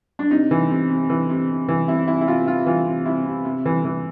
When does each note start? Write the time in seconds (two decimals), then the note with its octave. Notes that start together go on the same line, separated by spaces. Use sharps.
0.19 D4
0.31 C3 D#4
0.51 E3
0.70 C3
0.90 C3
1.10 E3
1.29 C3
1.49 C3
1.68 E3
1.88 C3 E4
2.07 C3 E4
2.21 E4
2.28 C3 F4
2.47 C3 F4
2.66 E3 F4
2.87 C3
3.05 C3 E4
3.26 C3
3.45 C3
3.65 E3
3.85 E3